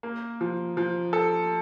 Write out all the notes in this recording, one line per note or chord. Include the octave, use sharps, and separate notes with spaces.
A#3
F3
F3
A4